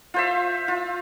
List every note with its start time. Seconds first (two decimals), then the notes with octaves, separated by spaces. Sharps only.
0.14 F4 C5 E5
0.68 F4